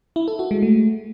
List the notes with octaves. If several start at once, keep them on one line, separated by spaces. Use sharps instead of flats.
E4
A4
F#4
G#3
A3